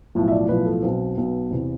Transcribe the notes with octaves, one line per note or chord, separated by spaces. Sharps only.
B1 A2 F3
E5
D5
B1 A2 F3 B4
A4
B1 B2 C4
B1 B2 B3
E2 C3